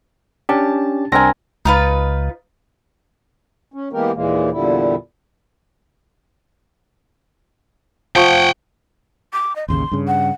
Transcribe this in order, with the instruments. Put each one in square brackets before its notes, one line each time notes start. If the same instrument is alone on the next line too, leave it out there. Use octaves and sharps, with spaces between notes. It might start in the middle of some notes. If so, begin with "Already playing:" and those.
[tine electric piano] C#4 D4 G4 [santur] A5
[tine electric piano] C2 D4 A#6 [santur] C4 A#4 G#5
[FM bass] C#2 [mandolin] D#4 F4 B4
[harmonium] C#4
E3 G#3 A#3 B3 G4 A#4
D#2 A#2 E3 G#3 A#3
E2 A#2 D3 G3 E4
[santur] F3 C#6 [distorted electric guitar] F#5 G5
[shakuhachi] D6
D#5
[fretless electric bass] A1 D#2 C#3 [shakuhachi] C6
[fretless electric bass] G2 C#3
[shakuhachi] F#5